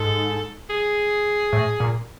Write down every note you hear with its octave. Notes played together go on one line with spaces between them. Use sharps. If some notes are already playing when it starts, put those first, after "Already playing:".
Already playing: G#2 A4
G#4
A2
A#2